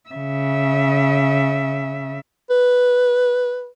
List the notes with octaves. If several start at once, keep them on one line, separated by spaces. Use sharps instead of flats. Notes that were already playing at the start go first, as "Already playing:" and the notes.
C#3 E5
B4